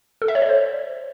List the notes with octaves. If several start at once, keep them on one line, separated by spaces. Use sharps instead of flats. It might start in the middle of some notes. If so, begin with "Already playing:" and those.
A4
E5
C#5
D5
C5